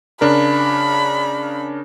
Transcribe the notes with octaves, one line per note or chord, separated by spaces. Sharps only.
C#3 D4 A#4 B5